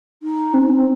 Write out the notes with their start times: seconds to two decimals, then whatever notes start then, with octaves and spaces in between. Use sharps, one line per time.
0.22 D#4
0.53 C4
0.61 D#4
0.68 C4